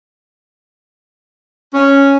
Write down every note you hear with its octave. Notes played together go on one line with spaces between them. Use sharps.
C#4